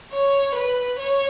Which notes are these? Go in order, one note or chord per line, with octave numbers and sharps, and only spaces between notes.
C#5
B4
C#5